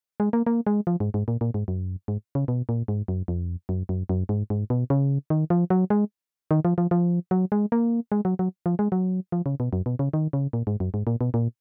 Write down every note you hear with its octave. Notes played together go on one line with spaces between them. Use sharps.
G#3
A#3
A#3
G#3
F3
G#2
G#2
A#2
A#2
G#2
F#2
G#2
C#3
B2
A#2
G#2
F#2
F2
F#2
F#2
F#2
G#2
G#2
B2
C#3
D#3
F3
F#3
G#3
D#3
F3
F3
F3
F#3
G#3
A#3
G#3
F#3
F#3
F3
G#3
F#3
F3
C#3
B2
F#2
B2
C#3
D#3
C#3
A#2
G#2
F#2
G#2
A#2
B2
A#2